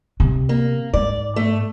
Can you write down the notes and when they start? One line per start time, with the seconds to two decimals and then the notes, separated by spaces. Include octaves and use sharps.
0.20 C3
0.49 A#3
0.93 G#2 D5
1.36 A3